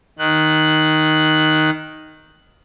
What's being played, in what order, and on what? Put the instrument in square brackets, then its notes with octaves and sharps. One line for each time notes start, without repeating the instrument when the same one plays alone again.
[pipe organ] D#3 F#6